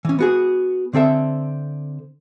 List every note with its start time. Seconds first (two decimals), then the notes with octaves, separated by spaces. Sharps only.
0.05 E3 C#4
0.19 B3 F#4 G#4
0.93 D3 C4 A4 E5